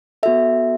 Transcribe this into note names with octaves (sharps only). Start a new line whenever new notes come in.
B3 F#4 A4 E5